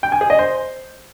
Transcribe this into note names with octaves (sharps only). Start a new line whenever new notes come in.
G5
G#5
G#4
D#5
C5